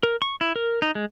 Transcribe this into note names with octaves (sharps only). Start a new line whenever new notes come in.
A#4
C#6
E4
A#4
D#4
G#3